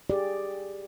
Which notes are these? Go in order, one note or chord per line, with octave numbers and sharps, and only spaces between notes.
G4 G#4 D5